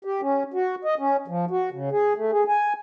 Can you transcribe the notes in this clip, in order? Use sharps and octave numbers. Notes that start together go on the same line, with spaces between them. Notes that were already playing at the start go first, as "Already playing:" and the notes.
G4
C#4
F#4
D#5
C#4
F3
F#4
C#3
G#4
A3
G#4
G#5